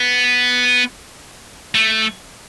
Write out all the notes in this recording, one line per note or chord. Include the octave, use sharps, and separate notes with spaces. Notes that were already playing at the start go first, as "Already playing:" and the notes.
Already playing: B3
A3